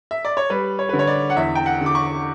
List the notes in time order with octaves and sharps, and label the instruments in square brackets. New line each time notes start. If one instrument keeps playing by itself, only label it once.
[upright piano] E5
D5
C#5
G3 B4
C#5
D3 B4
C#5
D5
F#5
E2 E5
G5
F#5
D3
D6
C#6